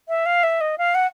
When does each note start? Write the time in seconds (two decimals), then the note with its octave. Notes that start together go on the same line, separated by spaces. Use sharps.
0.08 E5
0.26 F5
0.43 E5
0.61 D#5
0.78 F5
0.94 F#5